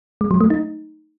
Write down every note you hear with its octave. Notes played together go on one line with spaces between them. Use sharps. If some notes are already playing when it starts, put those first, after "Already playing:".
G#3
F#3
A3
D#4